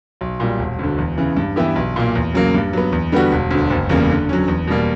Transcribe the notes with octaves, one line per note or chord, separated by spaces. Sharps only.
B1
A#2 G3
E1
D2 D3
E2
C#3 E3
G2
E3 B3 E4 G4
B1
A#2 A#3
E2
C#3 F#3 A#3
G2
F#3 B3
E2
D3 G3 B3 F#4
E1
D2 D3
F#1
E2 C#3 G3 A#3
D3
F#3 C#4
E2
B2 G3 A#3